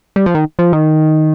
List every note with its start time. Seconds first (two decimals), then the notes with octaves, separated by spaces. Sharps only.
0.16 G3
0.26 F3
0.35 D#3
0.59 F3
0.73 D#3